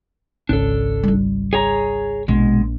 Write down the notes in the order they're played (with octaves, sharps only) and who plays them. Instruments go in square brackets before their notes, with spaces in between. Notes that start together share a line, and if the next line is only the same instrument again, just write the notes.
[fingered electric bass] G#1 C#2 C#4 [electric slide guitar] D4 A4
[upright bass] G3 F4
[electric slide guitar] G#4 C#5 A#5
[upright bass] A#1 [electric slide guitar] B2 G#3